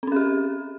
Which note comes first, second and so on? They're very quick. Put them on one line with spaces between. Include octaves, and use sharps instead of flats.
C4 C#4 G#4 G4